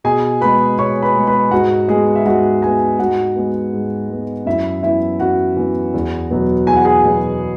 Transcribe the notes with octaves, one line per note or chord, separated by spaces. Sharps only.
B2 G#4 G#5
G#3 B3 B4 B5
B2 C#5 C#6
B4 B5
G#3 B3
B4 B5
G#2 F#4 F#5
G#3 B3 G#4
E5
G#2 F#4 F#5
G#3 B3 G#4 G#5
G#2 F#4 F#5
G#3 B3
G#2
G#3 B3
F#2 E4 E5
E3 B3 E4 E5
F#2 F#4 F#5
E3 B3
E2
B2 F#3 B3
E2 G#5
F#5
G#4 G#5
B2 F#3 B3